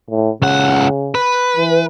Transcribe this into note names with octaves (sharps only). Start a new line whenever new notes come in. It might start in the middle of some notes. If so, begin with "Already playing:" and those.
A2
C#2 C#3 F#5
B4
E3